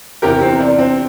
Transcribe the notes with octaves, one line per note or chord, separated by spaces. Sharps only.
E2 C3 E3 G4 A#4
C4
D4
C4